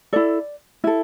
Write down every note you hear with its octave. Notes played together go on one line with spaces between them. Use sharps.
E4 A4 D5
E4 A4